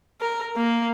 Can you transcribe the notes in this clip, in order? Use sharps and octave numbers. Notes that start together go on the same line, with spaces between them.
A#4
A#3